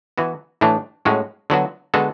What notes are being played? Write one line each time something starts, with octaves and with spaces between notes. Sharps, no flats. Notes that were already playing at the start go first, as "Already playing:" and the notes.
E3 B3 F#4
A2 E3 A3 D4
A2 G#3 C#4 F#4
D3 F#3 B3 F#4
D3 G#3 B3 F#4 A4